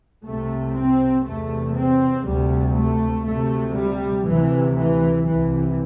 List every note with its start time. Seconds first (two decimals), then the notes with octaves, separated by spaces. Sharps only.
0.25 C2 C3 A3
0.75 C4
1.25 E2 C3 A3
1.76 C4
2.25 D2 C3 G3
2.76 A3
3.26 D2 C3 A3
3.76 G3
4.26 D2 C3 E3
4.76 E3
5.26 C2 C3 E3